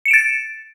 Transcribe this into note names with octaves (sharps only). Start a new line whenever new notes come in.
A6 C#7 D7 E7